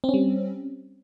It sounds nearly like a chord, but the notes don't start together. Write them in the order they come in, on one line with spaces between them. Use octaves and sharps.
C4 C#4 G3